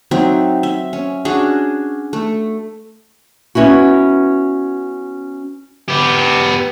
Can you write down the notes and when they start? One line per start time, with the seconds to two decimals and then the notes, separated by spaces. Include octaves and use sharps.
0.11 F#3 C4 D#4 E5
0.63 E5
0.93 C#4
1.25 C#4 D4 F#4 G#4
2.13 A3
3.55 B3 C#4 E4 F#4
5.88 B3 G4